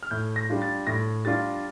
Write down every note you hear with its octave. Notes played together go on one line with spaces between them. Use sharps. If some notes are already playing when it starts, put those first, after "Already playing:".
F6
A2 G6
A#6
G3 D4 F4
A6
A2 A#6
G3 D4 F4 A6